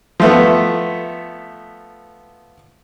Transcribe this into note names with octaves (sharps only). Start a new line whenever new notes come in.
F3 A3 B3